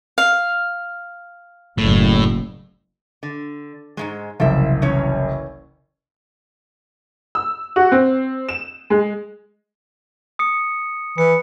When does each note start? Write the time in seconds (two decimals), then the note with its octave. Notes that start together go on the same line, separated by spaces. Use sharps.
0.18 F5
1.78 F#1 A2
3.23 D3
3.97 G#2 C#3 G#3
4.40 F#1 C2 F3 E5
4.82 E3 C#4 C#5
7.35 E6
7.76 F#4
7.92 C4
8.49 E7
8.90 G#3
10.39 D#6 C#7
11.18 E3 C#7